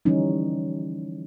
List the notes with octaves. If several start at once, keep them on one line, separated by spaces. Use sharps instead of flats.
D3 E3 F3 G3 C#4 D#4